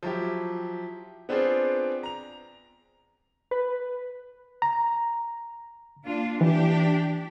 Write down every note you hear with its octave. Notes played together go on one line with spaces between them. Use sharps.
F3 F#3 E4 G4
B3 C4 D4 F4 G#4 C5
A#5 F7
B4
A#5
A#3 D4 F4
E3 D4 G4